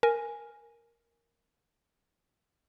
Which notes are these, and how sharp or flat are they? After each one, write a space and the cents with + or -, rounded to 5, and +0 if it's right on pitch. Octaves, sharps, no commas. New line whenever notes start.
A#4 +0 G#5 +0